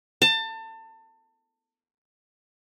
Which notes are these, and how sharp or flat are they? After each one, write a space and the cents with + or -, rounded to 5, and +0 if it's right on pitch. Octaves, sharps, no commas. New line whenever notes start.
A5 +30